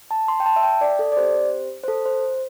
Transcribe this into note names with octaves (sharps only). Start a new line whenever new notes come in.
A5
C6
G5
A5
E5
G5
D5
A4
D5
C4 G4 C5
C5
A4
C5